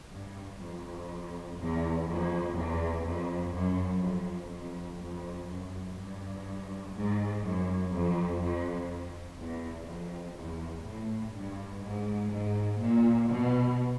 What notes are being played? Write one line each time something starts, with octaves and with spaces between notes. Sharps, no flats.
G2
F2
E2
F2
E2
F2
F#2
F2
F2
F2
F#2
G2
G#2
F#2
F2
F2
E2
F2
E2
A2
G2
G#2
G#2
A#2
B2